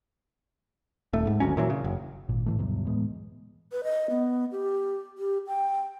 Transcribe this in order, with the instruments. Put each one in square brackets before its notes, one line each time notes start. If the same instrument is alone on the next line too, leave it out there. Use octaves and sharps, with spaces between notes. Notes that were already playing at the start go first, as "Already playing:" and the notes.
[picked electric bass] D#1 A3
G#2
G#1 D2 F#3 C#4
A#2 E3 F#3
C#3
F#1
G#1 A#2
A2 E3 A3
D2 G2 B2 F#3
A2 E3 G#3 B3
[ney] B4
D#5
B3
G4
G4
G5